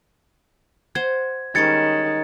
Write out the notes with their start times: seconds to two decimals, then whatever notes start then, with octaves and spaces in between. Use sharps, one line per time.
0.95 C5 F#5 C6 G#6
1.55 D#3 G3 G#3 C#4 G#6 A6 C#7